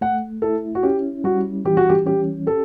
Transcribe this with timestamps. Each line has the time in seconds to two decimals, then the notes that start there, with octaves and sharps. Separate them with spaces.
0.01 A3 F#5
0.42 E4 A4
0.75 F#4
0.83 C#4 G4
1.24 G3 F#4
1.65 E3 G4
1.77 F#4
1.90 G4
2.06 C#4 G4
2.47 G4 A4